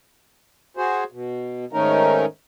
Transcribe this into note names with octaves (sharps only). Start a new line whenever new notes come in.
F#4 G#4 C5
B2
G#2 D#3 A3 C#4 D#4 A#4